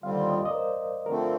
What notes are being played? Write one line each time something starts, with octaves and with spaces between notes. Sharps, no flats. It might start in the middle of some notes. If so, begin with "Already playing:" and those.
D#2 D3 G3 C4 F4 F5
D#5
D5
D#5
A#4
C5
D3 F3 A3 C4 A#4